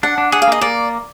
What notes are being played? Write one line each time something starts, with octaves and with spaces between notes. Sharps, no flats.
D4 F#5
D4
G#4 F#5
F5
A#3 D#5
A#3 D5